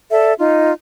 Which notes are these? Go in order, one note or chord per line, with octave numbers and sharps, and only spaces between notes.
A4 D5 E5
D#4 F4